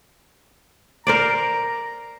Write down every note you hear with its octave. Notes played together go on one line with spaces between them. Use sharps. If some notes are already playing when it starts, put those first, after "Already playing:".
A#4 C5 D5 A#5